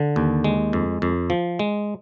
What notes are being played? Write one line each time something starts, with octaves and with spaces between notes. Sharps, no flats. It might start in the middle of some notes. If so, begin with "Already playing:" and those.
Already playing: D3
D#2
G#3
F2
F2
F3
G#3